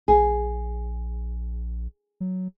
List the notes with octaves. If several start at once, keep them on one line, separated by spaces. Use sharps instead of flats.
A#1 G#4
F#3